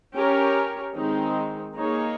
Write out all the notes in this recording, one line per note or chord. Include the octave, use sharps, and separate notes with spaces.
C#4 G4 A#4 C#5
D#3 G#3 C4 D#4
A#3 D#4 G#4 C#5